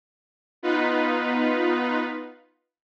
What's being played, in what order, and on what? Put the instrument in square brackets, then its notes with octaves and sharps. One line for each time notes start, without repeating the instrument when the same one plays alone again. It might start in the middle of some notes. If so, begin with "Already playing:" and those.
[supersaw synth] B3 D#4 F4 B4